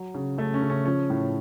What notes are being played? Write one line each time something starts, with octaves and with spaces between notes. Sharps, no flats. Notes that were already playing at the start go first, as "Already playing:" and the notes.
Already playing: F#3
C#3
C#3 A3
C#4
C#3
C#4
F3 C#4
A2